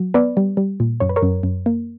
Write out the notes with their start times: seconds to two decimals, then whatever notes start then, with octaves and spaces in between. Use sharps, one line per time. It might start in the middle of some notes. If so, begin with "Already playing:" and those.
Already playing: F#3
0.14 B3 B4 D5
0.37 G3
0.57 G3
0.80 A#2
1.00 F#2 C#5
1.09 B4
1.16 A#4 C#5
1.22 F#2
1.43 F#2
1.66 A#3